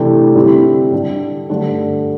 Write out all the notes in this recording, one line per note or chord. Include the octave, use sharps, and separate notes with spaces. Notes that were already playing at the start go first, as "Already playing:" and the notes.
Already playing: C3 E3 A3 D4
D3 G3 C4 E4 G4
D3 G3 D4
G2 D3 A3 D4